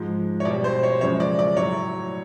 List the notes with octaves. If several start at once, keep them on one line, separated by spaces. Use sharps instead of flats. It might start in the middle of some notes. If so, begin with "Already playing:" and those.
Already playing: G#2 F3 G#3
C#5
B2 G3 D5
C5
C#5
F#2 C#3 F3 G#3 C#5
D5
D5
A2 F#3 C#5